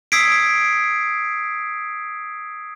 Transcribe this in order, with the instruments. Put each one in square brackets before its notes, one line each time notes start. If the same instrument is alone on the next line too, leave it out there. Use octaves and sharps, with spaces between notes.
[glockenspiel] D#6 E6 G#6 B6 C7 D7